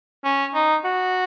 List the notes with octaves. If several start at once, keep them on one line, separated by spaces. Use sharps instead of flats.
C#4
D#4
F#4